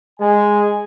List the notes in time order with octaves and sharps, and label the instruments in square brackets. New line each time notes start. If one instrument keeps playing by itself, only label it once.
[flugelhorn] G#3 [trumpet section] G#5